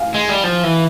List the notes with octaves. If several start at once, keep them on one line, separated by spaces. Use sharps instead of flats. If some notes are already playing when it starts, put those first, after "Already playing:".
Already playing: F5 G#5
G#3
G3
F3
E3